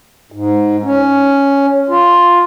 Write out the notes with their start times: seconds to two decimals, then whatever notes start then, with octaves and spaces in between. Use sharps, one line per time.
0.32 G#2
0.84 C#4
1.89 F4